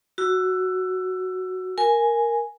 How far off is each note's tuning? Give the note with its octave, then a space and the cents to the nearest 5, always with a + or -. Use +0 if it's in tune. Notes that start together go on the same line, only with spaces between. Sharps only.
F#4 +0 E6 +20
A#4 +0 G#5 +0